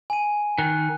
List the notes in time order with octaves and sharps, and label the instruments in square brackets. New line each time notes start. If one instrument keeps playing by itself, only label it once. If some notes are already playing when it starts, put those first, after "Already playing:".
[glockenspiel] G#5 D#7
[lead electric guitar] D#3 [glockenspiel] F#6